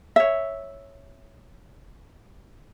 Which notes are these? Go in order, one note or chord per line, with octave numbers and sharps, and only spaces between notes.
C#5 E5